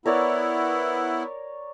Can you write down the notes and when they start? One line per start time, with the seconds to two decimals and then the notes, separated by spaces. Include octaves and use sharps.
0.06 B3 E4 A#4 C#5 D5